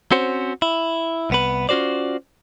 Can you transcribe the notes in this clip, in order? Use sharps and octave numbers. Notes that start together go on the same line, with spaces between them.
C4 C#4 F#4 C5
E4
C2 B3 B4
C#4 F4 F#4 C5 D5